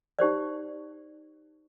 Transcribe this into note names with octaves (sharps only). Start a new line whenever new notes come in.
D#4 G4 C5 D5